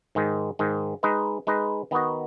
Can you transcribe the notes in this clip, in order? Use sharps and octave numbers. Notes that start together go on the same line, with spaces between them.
G#2 D#3 G#3
G#2 D#3 G#3
G#3 D#4 B4 D#5
G#3 D#4 B4 D#5
D#3 B3 D#4 F#4 D#5